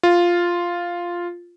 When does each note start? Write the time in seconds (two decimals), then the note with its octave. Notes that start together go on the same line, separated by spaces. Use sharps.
0.03 F4